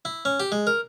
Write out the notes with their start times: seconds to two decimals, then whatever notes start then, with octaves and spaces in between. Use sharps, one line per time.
0.05 E4
0.25 C#4
0.40 G4
0.52 G#3
0.67 A#4